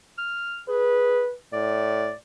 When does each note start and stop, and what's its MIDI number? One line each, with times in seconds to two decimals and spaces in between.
0.18 0.62 89
0.69 1.24 68
0.69 1.33 71
1.53 2.10 45
1.53 2.14 74